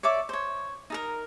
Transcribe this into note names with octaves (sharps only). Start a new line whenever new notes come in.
C#5 D5 E5 D6
C5 C#5
D#4 A4 A#4